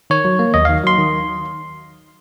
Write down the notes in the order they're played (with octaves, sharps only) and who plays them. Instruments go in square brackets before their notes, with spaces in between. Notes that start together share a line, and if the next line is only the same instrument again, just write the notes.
[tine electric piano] D#3 C#5
F#3
A#3
D#2 D#5
D#3 F5
F#3 C6
D#3